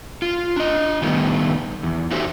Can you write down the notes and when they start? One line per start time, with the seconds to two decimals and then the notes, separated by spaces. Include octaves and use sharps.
0.22 F4
0.56 D4 D#5
1.02 D#3 G3 A3 B3
1.83 E2
2.11 D#4 F#4 G4 A4 C5 E5